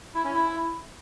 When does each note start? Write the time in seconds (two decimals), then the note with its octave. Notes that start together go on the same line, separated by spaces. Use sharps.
0.15 E4
0.24 C#4
0.34 E4